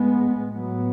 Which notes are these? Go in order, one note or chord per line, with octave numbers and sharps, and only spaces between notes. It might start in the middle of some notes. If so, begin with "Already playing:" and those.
Already playing: A2 G#3 B3
A2 F#3 B3